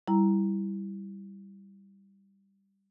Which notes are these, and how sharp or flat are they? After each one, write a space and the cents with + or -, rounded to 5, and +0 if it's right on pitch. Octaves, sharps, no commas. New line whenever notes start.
G3 +0 E4 +0 A#5 +0